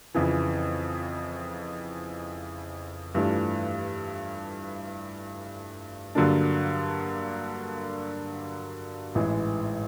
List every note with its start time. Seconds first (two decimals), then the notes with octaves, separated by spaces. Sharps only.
0.15 F2 C#3 E3
3.15 G2 E3 A3 D4 F4
6.15 G2 D3 F#3 A#3 D4
9.15 A1 G#2 E3 G#3